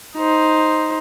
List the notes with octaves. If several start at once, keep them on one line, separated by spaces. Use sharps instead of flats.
D#4 C5